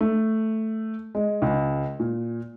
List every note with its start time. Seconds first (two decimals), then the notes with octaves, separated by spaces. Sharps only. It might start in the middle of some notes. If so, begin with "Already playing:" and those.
0.01 A3
1.15 G#3
1.42 C#2
2.00 A#2